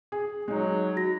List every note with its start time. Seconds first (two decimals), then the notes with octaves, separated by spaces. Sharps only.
0.12 G#4
0.48 F#3 G#3 D#4
0.97 F#4 A#6